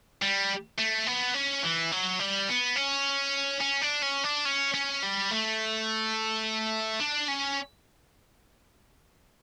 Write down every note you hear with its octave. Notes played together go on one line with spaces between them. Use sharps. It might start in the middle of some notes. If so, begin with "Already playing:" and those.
G3
A3
B3
C#4
E3
F#3
G3
B3
C#4
C#4
D4
C#4
D4
C#4
C#4
G3
A3
D4
C#4